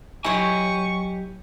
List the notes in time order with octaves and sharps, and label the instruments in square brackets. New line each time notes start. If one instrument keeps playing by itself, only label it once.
[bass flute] F#3 [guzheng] E4 C#5 [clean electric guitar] G4 D#5 G#5 [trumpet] C#6